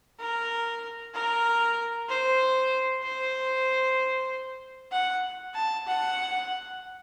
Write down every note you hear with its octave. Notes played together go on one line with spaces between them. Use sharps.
A#4
A#4
C5
C5
F#5
A5
F#5